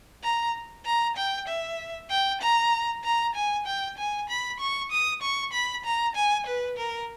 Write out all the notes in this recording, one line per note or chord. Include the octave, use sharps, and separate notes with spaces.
A#5
A#5
G5
E5
G5
A#5
A#5
G#5
G5
G#5
B5
C#6
D#6
C#6
B5
A#5
G#5
B4
A#4